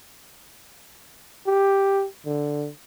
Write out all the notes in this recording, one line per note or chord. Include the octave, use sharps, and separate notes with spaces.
G4
D3